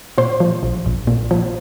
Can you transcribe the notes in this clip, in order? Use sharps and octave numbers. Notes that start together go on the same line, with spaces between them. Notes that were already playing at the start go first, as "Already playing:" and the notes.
A#2 C5
F3
A#1
A#1
A#2
F3